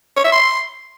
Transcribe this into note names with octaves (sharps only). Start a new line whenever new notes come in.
C#5
E5
C6